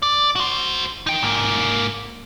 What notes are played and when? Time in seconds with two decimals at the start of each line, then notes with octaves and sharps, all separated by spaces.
0.03 D5
0.36 F#4 C5
1.07 D#4 G5
1.23 G#2 A#3